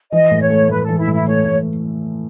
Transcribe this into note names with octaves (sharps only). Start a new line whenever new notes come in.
E3 D#5
A2
C#5
A3
A2 B4
E3 A4
E4
A2
E4
A3 C#5
A2